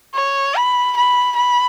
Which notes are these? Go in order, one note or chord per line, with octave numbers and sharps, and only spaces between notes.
C#5
B5
B5
B5